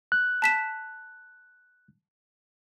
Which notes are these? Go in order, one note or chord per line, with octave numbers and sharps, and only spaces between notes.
F#6
A5 B6 E7